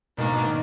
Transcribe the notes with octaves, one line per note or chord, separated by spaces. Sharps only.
G#2 B2 D#3 A#3 D4
B2
D#3